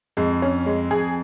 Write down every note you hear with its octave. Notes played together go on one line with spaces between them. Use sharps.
F2 G#3
C#4
G#3
F2 G#4